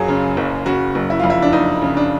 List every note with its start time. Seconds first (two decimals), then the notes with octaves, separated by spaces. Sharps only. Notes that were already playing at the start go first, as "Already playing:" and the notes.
Already playing: F#1 F#2 F#3 F4 G#4
0.08 C#3
0.37 F#1
0.66 C#3 F#4
0.95 F#1
1.10 E4
1.19 F2 F4
1.30 E4
1.42 D4
1.52 F#1 D#4
1.82 C#3
1.97 D4